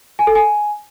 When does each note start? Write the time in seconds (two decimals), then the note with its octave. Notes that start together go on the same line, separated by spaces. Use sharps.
0.19 G#5
0.27 A4
0.35 G#5